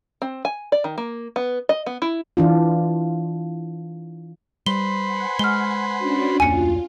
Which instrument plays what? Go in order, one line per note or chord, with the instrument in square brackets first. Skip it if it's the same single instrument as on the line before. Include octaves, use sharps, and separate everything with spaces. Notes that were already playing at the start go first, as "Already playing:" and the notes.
[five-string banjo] C4
G#5
D5
D#3
A#3
B3
D#5
B3
E4
[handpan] E3 D4 F4
[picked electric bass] G3 [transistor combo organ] B4 C5 [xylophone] G7
[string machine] F#5 G#5
[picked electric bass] G#3 [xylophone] F6 G7
[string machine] C#4 D4 F#4
[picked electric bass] D1 F2 A#3 [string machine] F4 [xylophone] G#5 C#7